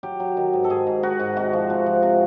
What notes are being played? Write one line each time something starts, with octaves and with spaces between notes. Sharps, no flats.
F#3 G4
F#3
D#3
G#2
A4
G#2 G#4
G#2
D#3 F#4
G#2
C3 F#4
F3
C3
F3
C3